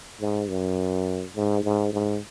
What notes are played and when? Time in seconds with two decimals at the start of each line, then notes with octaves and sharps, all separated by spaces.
0.21 G#2
0.49 F#2
1.36 G#2
1.64 G#2
1.93 G#2